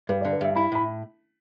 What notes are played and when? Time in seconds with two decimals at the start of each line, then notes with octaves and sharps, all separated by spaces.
0.09 G2 B4
0.21 D5
0.25 D3
0.33 B4
0.41 G2 E5
0.56 E4 B5
0.72 A2 B5